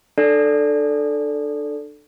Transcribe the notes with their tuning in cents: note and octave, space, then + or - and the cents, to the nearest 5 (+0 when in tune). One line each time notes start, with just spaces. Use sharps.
D4 +30 A4 +0 D5 -10